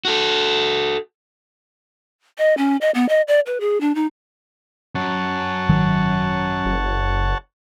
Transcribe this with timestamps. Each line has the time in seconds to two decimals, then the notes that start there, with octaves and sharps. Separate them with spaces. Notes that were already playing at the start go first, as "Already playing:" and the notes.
0.05 F#4 A4
2.39 D#5
2.58 C#4
2.81 D#5
2.95 B3
3.09 D#5
3.28 D5
3.46 B4
3.60 G#4
3.81 D4
3.95 D#4
4.95 F#2 C#5 F#5 A5
5.69 G#1 D#3 F#3
6.66 F#1